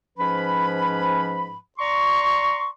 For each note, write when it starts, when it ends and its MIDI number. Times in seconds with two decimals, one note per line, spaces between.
0.18 1.57 44
0.18 1.57 53
0.18 1.57 61
0.18 1.57 71
0.18 1.57 83
1.79 2.68 74
1.79 2.68 82
1.79 2.68 84
1.79 2.68 85